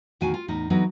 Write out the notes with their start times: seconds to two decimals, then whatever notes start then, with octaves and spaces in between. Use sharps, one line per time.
0.21 E2 A2 D#3 F#4 F5 G#5
0.34 F4
0.48 E2 A2 D#4
0.70 E3 F#3 B3 D4 D#4 A4